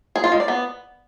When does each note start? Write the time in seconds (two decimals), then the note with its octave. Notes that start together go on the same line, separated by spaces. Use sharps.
0.16 G#4
0.24 F4
0.32 G#3
0.40 D5
0.48 B3